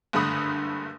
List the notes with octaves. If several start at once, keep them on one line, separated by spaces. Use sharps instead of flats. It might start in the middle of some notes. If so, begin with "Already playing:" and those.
F#1 G2 D3 A3 B5 D#6